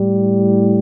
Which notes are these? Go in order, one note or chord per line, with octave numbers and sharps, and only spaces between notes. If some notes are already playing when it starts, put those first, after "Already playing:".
Already playing: A2 G3